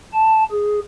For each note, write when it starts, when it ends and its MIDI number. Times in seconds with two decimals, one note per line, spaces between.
0.13 0.43 81
0.52 0.80 68